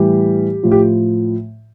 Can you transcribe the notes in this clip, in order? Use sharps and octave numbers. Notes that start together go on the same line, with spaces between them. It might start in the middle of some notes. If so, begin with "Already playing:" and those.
Already playing: A2 E3 G3 G4
A2 F3
G4